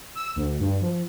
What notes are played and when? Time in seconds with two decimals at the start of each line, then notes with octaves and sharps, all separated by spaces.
0.15 E6
0.36 D2
0.60 G2
0.81 F3